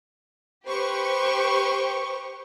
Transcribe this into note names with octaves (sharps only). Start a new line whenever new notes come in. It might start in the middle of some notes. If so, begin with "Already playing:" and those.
G4 B4 C5 C#6